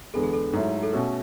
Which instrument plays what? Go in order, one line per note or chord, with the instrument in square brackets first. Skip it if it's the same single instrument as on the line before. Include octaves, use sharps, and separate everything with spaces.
[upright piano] E2 D3 G#3 B3 [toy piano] A4
[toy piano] G#4
A4
[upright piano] G#2 F#3 A3 E4
[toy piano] A4
[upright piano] B2 A3 C#4 F#4 [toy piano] B4